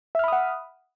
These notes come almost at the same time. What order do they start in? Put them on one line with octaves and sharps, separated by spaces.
E5 F6 B5 D#6 F#5